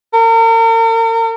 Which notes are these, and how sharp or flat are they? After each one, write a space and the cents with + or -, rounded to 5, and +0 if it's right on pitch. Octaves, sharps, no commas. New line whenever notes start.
A#4 -40